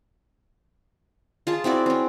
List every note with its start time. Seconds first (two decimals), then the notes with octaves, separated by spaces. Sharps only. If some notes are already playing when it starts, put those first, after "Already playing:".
1.47 F4 G#4 A5
1.64 C4 E4 F#4 D5
1.86 C4 C#4